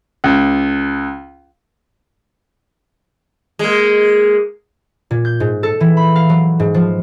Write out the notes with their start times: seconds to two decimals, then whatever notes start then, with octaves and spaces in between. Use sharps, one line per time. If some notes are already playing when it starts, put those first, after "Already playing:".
0.24 C#2
3.59 G#3 A#3
5.11 A#2
5.25 G6
5.40 G#2
5.63 A4
5.80 E3
5.97 B5
6.16 F5
6.29 F#3
6.60 G#2
6.74 F3